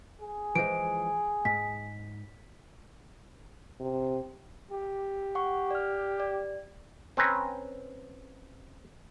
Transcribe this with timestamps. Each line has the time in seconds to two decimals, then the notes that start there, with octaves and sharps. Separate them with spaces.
0.21 G#4
0.55 E3 F3 G#3 D7
1.45 G#2 B6
3.80 C3
4.71 G4
5.35 F#5 C#6
5.71 D5 F6
6.20 D5
7.17 C4 C#4 B4 A#5